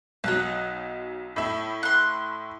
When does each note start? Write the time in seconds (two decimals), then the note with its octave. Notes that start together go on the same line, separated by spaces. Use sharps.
0.24 B1 F#3 D#4 F#5 F#6
1.36 A2 E4
1.83 C6 F#6